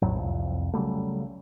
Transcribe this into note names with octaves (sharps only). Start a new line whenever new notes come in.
A#1 F2 A2 F#3
C2 F2
C#3 F#3 G3 A3